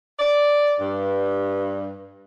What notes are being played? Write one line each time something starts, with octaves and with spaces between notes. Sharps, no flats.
D5
G2